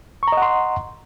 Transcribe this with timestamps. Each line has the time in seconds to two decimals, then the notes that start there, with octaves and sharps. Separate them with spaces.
0.23 C#6
0.28 A#5
0.32 D#5
0.37 F#5
0.42 C6